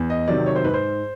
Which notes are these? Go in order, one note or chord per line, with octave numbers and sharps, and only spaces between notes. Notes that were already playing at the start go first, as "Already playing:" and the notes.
Already playing: E2
D#5
C3 D#3 F#3 D5
C#5
C5
G#2 B4
C5